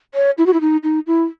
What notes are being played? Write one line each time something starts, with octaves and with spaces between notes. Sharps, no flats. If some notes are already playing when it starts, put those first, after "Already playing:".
C#5
E4
F#4
E4
D#4
D#4
E4